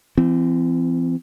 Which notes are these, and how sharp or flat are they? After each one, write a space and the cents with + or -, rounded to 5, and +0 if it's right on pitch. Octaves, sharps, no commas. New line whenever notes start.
E3 +40 C4 -25